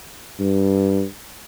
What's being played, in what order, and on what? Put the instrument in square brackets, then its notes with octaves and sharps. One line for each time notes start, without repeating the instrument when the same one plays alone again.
[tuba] G2